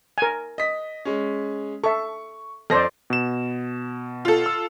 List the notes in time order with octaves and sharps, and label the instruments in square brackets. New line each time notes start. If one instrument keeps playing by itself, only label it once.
[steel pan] A#4 G#5
[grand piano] D#5 B6
G#3 C#4
[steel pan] A4 E5 [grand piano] C#6
[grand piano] F2 A#6 [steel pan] A4 C5 D5
[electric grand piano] B2 E7
[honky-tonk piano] F4 A4
[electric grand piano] E6